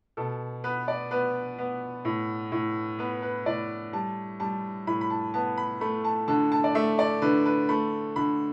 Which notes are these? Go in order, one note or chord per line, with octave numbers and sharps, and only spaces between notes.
B2 A4
B3 B4
D5
B3 B4
B3
A2
A2
B3 B4
B4
A2 D5
G3 A5
G3 A5
A2 B5
B5
A5
B3 A5
B5
A3 B5
A5
D3 A5
A5
D5
A3 E5
D5
D3 B4
B4
A3 B5
D3 B5